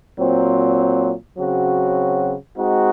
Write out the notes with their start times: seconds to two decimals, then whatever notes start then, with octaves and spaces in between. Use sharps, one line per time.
0.17 A#2 F#3 C4
1.37 C#3 F#3 C4 F#4
2.57 G#3 C4 D#4 F#4